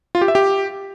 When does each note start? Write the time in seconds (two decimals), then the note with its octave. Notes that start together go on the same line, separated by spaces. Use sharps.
0.15 F4
0.21 G4
0.28 E5
0.35 G4